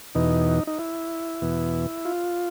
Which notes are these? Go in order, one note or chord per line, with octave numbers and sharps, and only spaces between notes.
E2 B2 D#4
D#4
E4
E2 B2
F4